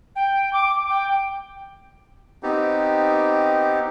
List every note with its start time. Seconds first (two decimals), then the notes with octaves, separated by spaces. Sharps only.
0.16 G5
0.53 D6
0.90 G5
2.43 B3 C4 D#4 G4